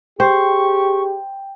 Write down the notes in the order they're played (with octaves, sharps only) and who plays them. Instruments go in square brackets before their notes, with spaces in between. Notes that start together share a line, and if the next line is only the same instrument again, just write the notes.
[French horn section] G4 G#4 [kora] C5 [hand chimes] G5 [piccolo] C#6